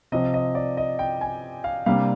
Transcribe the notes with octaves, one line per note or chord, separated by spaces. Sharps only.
C3 F3 C4 D#5
D#5
D5
D#5
G5
G#5
F5
C3 G3 A#3 D4 F5